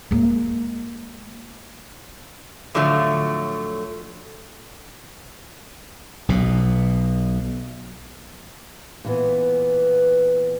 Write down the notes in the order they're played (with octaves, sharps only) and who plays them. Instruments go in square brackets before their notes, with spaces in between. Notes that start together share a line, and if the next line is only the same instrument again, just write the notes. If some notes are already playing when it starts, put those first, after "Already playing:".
[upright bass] G#3 A#3
[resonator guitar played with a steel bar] A2 D3 F3 F#3 A3
[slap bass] B1 B2
[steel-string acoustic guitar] A#2 E3 B3